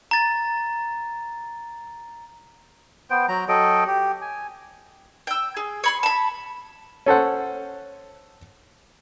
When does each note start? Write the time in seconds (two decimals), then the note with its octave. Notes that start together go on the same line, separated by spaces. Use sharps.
0.11 A#5 A6
3.10 B3 C5 G5
3.29 F#3 A#5
3.48 F#3 A4 D#5 G5
3.87 G4
4.21 G#5
5.27 G5 E6
5.57 G#4
5.84 C#5 B5 C6
6.03 A5 B5
7.06 C#4 A4 C5 F#5